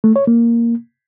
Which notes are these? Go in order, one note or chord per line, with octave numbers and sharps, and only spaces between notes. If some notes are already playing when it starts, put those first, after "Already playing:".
A3
C#5
A#3